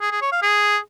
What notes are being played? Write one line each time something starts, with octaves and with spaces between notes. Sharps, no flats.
G#4
G#4
C#5
F5
G#4